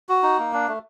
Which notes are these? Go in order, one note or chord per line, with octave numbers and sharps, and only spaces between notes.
F#4
D#4
A#3
D4
A3